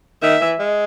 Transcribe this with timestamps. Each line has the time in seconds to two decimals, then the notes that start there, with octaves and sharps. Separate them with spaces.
0.22 D#3 E5
0.41 E3
0.59 G#3